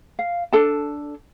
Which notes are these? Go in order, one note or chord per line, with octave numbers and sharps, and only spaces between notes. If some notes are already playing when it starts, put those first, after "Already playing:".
F5
D4 A4 A5